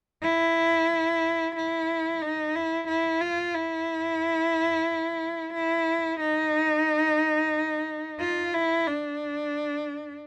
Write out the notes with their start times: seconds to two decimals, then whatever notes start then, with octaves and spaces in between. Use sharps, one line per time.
0.23 E4
1.56 E4
2.22 D#4
2.55 E4
2.88 E4
3.22 F4
3.55 E4
5.54 E4
6.21 D#4
8.20 F4
8.54 E4
8.87 D4